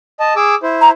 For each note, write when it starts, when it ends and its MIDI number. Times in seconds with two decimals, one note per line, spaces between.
0.20 0.34 75
0.20 0.34 81
0.36 0.55 68
0.36 0.55 86
0.36 0.55 88
0.63 0.91 64
0.63 0.91 72
0.81 0.89 82